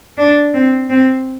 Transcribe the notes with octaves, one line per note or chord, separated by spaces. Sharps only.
D4
C4
C4